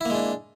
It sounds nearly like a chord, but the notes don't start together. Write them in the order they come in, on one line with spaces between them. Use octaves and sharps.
E4 A#3 G#3 D4